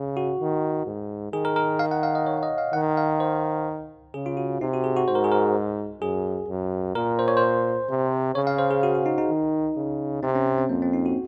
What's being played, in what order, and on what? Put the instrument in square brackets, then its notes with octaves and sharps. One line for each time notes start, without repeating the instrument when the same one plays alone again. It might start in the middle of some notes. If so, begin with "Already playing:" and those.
Already playing: [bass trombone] C#3
[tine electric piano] F#4
[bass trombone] D#3
G#2
[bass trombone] D#3 [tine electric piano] G#4
[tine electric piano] A#4
A#4
F5
F#5
F5
D#5
C#5
D#5
F5
[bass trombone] D#3 [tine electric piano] F#5
[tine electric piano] F5
C5
[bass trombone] C#3 [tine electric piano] G#4
[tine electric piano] F4
F#4
[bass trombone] C3 [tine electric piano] D#4
[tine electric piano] F#4
G#4
F#4
[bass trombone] G#2 [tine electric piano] C5
[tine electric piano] A#4
G#4
A#4
[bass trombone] F#2 [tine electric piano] G#4
[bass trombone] F#2
[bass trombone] A#2 [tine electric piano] A#4
[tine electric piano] C5
C#5
C5
[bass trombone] C3
[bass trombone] C#3 [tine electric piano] C#5
[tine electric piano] F5
C5
G#4
F#4
F#4
D#4
D#4
[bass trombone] D#3
C#3
[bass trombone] C3 [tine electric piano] C4
[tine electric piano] C#4
C4
C4
[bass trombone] F2 [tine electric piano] A#3
[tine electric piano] C4
D#4
F#4